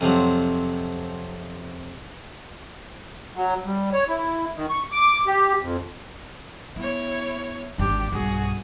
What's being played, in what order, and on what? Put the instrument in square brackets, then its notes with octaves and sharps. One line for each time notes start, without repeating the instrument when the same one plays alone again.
[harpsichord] F2 C3 F3 F#3
[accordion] F#3
G3
C#5
E4
D#3
C#6
D6
G4
F2
[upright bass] B3 [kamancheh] E4 C#5
[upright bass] G#1 E2 [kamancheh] D4 G4
[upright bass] B1 G2 [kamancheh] F#4 G#4